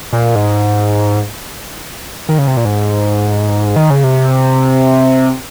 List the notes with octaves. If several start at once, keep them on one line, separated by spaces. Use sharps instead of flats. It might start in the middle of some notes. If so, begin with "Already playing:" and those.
A#2
G#2
D#3
C#3
C3
A#2
G#2
D#3
C#3
C3